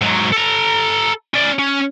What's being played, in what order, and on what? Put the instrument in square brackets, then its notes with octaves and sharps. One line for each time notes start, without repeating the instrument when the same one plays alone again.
[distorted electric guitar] G#2 F#3
A4 A#5
C#4 D5
C#4